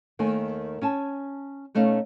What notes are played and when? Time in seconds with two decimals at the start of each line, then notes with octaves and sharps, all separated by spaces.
0.19 D#2 D#3 A3 G#5
0.81 C#4 G#5 A5
1.75 B2 A3 C#4 D#4 F5